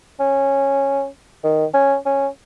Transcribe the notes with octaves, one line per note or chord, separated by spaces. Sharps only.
C#4
D#3
C#4
C#4